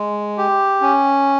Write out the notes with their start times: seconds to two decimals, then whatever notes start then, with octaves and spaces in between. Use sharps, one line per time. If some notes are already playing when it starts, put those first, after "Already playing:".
Already playing: G#3
0.38 G4
0.81 C#4